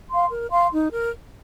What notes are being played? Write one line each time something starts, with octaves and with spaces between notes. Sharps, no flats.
F5 C6
A#4
F5 C6
D#4
A#4